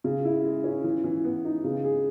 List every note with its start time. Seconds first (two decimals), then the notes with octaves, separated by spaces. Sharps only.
0.04 C#3
0.25 E4
0.45 G#3
0.64 C#4
0.84 E3
1.04 E3
1.25 B3
1.45 D#4
1.64 C#3
1.84 G#4